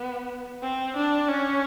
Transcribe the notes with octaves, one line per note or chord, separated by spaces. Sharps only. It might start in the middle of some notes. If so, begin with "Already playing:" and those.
Already playing: B3
C4
D4
C#4